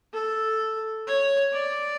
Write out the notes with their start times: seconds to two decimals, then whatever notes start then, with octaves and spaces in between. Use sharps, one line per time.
0.13 A4
1.06 C#5
1.53 D5